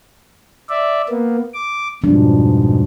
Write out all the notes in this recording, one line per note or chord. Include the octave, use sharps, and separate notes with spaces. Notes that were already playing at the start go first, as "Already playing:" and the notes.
D5 E5
A#3 B3
D6
F2 G#2 B2 F3 G3 D4